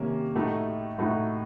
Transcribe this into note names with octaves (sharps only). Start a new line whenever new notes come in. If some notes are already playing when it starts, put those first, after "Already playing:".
Already playing: C3 D#3 A#3 C#4
A2 A3 D#4 F#4
A2 A3 D#4 F#4